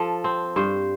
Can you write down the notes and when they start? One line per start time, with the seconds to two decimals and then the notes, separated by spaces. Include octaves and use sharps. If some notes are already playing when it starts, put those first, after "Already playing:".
Already playing: F3 A4
0.24 C4
0.56 G2 C5